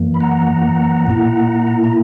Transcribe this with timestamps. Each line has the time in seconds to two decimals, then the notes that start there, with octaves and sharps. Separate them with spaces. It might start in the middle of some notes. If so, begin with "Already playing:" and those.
Already playing: F#2 E3 A#3
0.14 B5
0.21 F#5 A#5
1.07 A#2 A#3 E4
1.84 A#5